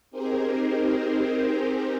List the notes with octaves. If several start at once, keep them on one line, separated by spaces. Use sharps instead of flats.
C4 D#4 G4 G#4 A#4 C5